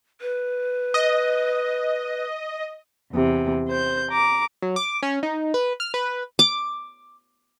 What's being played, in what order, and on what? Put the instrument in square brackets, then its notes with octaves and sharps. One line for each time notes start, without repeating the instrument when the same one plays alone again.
[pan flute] B4
[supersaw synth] D#5
[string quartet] E2 C3
C5 G6
A#5 D6
[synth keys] F#3
D6
C#4
D#4
B4
F6
B4
[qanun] D6